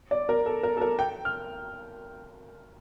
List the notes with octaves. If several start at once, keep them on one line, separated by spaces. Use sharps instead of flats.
D5
A#4
A4
A#4
A4
A#4
G5
F6